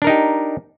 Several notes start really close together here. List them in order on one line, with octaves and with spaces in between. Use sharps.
D4 A#4 D#4 G4